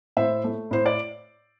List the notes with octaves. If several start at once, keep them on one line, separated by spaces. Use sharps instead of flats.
A2 C5 E5
A3
A2 C5
D5